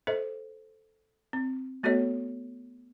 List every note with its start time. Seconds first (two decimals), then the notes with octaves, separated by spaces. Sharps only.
0.07 A4 C5 D#5 E5
1.33 C4
1.83 A3 B3 F#4 A4 C#5 D#5